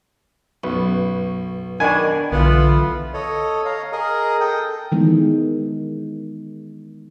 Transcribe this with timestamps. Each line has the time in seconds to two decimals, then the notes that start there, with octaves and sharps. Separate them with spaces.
0.64 B1 F#2 B4 C#6
1.80 D#3 D4 G#5 B5 C#6
2.32 B1 D3 E3 B3 F4
3.14 A4 C#5 D#5
3.66 C#5 F5 A#5
3.92 G#4 A#4 D#5
4.40 A4 G5 D#6
4.92 D#3 E3 G#3 B3